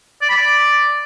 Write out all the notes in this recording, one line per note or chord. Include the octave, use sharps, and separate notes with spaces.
D5
B5
D5